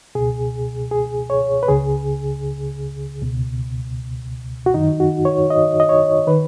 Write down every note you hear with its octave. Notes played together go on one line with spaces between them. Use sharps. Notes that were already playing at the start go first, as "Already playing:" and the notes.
C#2 B2 G#4
G#4
C#5
B4
C#2 C#3 G#4
C#2 B2
F#4
F#2 D#3 D#4
F#4
C#5
D#5
D#5
C#5
D#3 B4